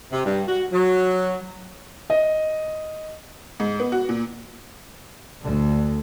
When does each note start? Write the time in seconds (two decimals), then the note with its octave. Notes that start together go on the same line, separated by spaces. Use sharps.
0.12 C3
0.26 G2
0.47 F#4
0.73 F#3
2.10 D#5
3.60 G#2
3.80 B3
3.92 F#4
4.09 A#2
5.42 D2 D3